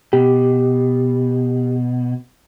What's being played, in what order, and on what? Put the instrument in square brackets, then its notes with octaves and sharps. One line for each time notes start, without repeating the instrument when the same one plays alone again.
[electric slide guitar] B2 [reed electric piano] G4